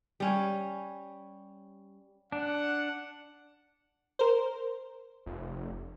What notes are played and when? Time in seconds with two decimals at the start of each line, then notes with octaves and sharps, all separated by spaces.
0.20 G3 C#4 C#5
2.32 D4 F#5
4.19 A#4 C5
5.26 F1